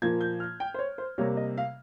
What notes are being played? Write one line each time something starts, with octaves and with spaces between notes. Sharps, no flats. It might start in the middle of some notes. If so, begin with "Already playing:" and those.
A#2 F3 A#3 G#6
G6
F6
G5
C5
C#5
C5
C3 G3 A#3 C#5
D#5
F5